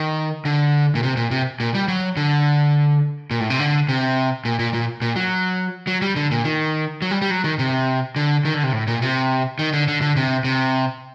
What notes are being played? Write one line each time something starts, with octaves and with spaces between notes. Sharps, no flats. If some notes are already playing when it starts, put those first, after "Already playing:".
Already playing: D#3
D3
A#2
C3
A#2
C3
A#2
G3
F#3
D3
A#2
A2
C3
D3
C3
A#2
A#2
A#2
A#2
F#3
F#3
G3
D3
A#2
D#3
F#3
G3
G3
F#3
D#3
C3
D3
D#3
D3
C3
A2
A#2
C3
D#3
D3
D3
D3
C3
C3